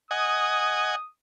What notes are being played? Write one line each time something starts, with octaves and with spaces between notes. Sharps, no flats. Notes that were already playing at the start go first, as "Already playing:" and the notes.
D#5 F#5 G#5 D#6